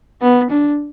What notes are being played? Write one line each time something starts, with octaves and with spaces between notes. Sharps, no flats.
B3
D4